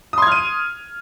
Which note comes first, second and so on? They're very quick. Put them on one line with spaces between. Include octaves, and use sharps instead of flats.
D#6 C6 G#6 F6 D#7